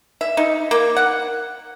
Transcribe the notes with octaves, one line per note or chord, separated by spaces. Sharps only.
E5
D#4
A#3
F#5